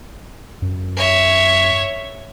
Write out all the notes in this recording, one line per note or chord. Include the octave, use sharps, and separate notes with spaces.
F#2
C#5 E5